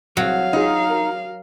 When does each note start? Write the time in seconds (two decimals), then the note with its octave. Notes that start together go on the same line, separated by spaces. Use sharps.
0.17 C2 F#3 F5
0.53 D#4 F4 G#4
0.90 A#4